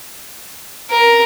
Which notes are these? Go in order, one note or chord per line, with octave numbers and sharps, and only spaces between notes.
A#4